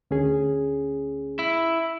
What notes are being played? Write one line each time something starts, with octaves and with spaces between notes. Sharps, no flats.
D2 C#4 G#4
E4